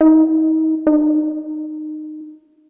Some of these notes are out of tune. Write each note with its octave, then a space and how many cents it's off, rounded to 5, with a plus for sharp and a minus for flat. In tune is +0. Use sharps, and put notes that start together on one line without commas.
D#4 +35
D#4 -20